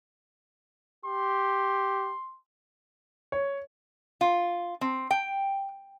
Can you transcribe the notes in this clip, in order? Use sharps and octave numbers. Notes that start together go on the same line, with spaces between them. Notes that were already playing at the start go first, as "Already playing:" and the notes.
G4 C6
C#5
F4
C4
G5